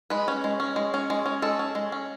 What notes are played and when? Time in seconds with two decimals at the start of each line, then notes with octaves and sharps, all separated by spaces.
0.10 G#3 B4
0.28 C#4
0.44 G#3
0.60 C#4
0.76 G#3
0.94 C#4
1.10 G#3
1.26 C#4
1.42 G#3 A4
1.59 C#4
1.75 G#3
1.92 C#4